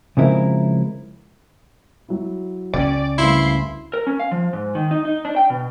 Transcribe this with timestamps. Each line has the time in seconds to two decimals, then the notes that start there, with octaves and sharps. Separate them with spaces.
0.17 C#3 F3 G#3 C4 E4 A#4
2.09 F#3 E4
2.74 C#2 C4 C#4 D5 G5
3.18 D2 G2 C#3 E4 C6
3.93 A#4
4.07 C#4
4.20 F5
4.32 F3
4.53 G#2
4.75 D#3
4.91 D#4
5.05 D#4
5.25 D4
5.36 G5
5.50 B2